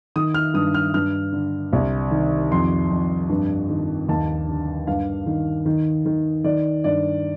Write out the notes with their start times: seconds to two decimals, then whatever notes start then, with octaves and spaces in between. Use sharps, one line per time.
0.16 D#3 D#6
0.34 F6
0.54 G2 D#6
0.74 F6
0.94 G2 F6
1.33 D3
1.73 C2
2.11 D#3
2.51 F2 C6
2.91 F2
3.29 G2
3.70 D#3
4.09 D#2 A5
4.48 D3
4.87 G2 F5
5.26 D#3
5.65 D#3
6.06 D#3
6.44 D#3 D5
6.84 G2 D5